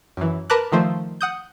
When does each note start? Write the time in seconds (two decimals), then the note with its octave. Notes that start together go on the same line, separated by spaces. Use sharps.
0.17 F#2 E3
0.50 A#4 B4 A5 D6 F#6
0.72 D#3 F3 A3 C5
1.21 F#5 D#6 G6